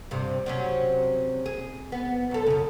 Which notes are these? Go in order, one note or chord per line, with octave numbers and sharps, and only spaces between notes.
G2 C3
C3 F#3 C#4
G#4
B3
F#2 A4
F#2 C#3